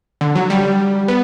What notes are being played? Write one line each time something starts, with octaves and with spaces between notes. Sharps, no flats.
D3
F#3
G3
B3